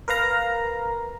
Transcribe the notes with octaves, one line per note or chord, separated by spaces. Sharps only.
A#4 B4 F5 A#5